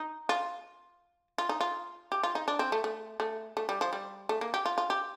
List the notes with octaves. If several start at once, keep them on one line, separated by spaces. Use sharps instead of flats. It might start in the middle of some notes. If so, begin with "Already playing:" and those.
Already playing: D#4
F4
F4
D#4
F4
G4
F4
D#4
D4
C4
A3
A3
A3
A3
G3
F3
G3
A3
A#3
G4
F4
F4
G4